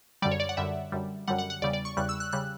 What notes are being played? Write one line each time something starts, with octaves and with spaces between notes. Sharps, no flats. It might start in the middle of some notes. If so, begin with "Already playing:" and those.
F#2 D3 G3 D5
C#5
D5
F#5
F#2 D3 G3 E5
F#2 D3 G3
F#2 D3 G3 F#5
F#5
F#5
E2 C#3 G3 D5
D5
C#6
E2 C#3 G3 F#6
E6
F#6
C#3 G3 F#6